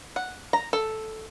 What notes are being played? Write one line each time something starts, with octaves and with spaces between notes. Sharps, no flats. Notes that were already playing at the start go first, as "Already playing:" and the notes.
F#5
A#5
A4